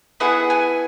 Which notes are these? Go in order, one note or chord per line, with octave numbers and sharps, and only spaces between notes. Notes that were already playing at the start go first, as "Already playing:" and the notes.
B3 E4 G#4 F#5
G#5